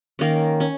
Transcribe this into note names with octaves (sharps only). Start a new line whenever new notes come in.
D#3 A#3 C#4
C#4